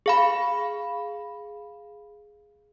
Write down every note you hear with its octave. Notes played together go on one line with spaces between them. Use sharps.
G#4 F5 B5